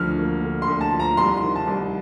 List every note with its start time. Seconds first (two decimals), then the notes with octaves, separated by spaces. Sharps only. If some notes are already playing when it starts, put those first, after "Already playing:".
Already playing: D2 F3 F6
0.18 A#3
0.44 D3
0.62 C6
0.68 D2
0.81 A5
0.93 F3
1.00 A#5
1.17 C2 C6
1.37 C6
1.42 D#3
1.56 A5
1.68 C2